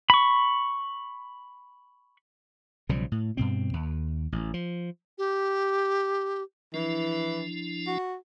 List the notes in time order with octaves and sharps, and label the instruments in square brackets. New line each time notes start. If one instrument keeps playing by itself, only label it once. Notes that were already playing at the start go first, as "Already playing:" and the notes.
[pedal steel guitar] B5 C#6
[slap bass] B1 C#3 F3 G3
A2
G2 B2 C4
D#2
A1
F3
[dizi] G4
[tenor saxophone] E3 [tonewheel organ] F3 D4 E4
[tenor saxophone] F#4